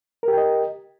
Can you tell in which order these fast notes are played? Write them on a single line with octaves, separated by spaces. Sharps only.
A#4 G4 G5 D#5